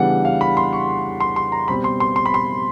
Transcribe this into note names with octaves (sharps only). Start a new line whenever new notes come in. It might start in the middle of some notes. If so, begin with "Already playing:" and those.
Already playing: C#3 E3 G3 B3 D4 F#5
F5
B5
C6
C#6
C6
C6
A#5
B2 G3 C4 B5
C6
C6
C6
B5
C6